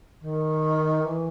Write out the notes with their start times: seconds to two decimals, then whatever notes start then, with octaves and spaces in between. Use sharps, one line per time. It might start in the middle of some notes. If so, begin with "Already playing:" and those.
0.21 D#3
1.02 E3